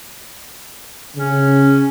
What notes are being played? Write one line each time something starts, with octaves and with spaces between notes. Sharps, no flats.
C#3 C#4